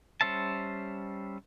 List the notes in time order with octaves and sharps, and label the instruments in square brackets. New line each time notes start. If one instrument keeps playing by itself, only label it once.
[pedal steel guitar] G3 C#4 C5 E5 A5